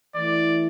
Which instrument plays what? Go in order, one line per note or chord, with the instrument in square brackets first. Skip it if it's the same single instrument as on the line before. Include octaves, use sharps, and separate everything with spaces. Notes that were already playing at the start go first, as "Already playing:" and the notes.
[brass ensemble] E3 A3 E4 [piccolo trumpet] D5